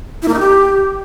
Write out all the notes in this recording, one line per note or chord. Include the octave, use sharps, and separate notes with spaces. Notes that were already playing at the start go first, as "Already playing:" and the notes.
E4
A#3
D#4
G4